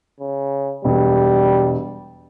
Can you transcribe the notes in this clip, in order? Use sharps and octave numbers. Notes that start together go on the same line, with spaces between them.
C#3
E1 G3